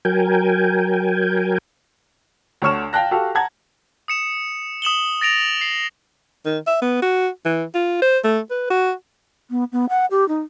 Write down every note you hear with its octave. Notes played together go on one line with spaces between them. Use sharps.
F#3 A#4 G5 G#5
D2 D3 C#5 C#6 F6 E7
F5 G5 A5 F#6 A#6
F#4 G4 A4 F5
F#5 A5 A#5 G#6
D#6 C#7 E7
D#6 E7 F#7 G7
A6 A#6 D7 F7
C7
D#3
E5
B3
F#4
E3
F4
C5
A3
B4
F#4
B3
B3
F#5
G4
D#4